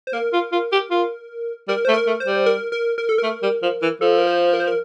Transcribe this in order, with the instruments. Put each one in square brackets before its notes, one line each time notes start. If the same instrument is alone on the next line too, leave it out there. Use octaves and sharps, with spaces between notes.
[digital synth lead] C5
[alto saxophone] A#3 [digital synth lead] A#4
[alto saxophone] F4
F4
G4
F4
[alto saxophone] G3 [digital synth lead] A#4
[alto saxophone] A3 [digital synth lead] C5
[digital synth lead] A#4
[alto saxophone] A3
[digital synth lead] C5
[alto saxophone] G3
[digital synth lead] A#4
A#4
A#4
A4
[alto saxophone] A3 [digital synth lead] A#4
[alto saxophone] G3
F3
E3
[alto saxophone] F3 [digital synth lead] A4
[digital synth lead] A#4
C5
A#4
C5
A#4